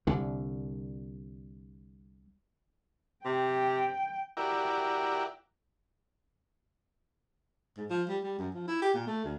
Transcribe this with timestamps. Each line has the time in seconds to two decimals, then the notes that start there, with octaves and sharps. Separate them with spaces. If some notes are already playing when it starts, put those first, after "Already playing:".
0.07 C2 D3
3.25 C3 G5
4.37 E4 F#4 G4 A#4 D5
7.77 G#2
7.90 F3
8.09 G3
8.23 G3
8.39 F#2
8.54 F3
8.68 E4
8.82 G4
8.94 A#2
9.07 A3
9.25 D2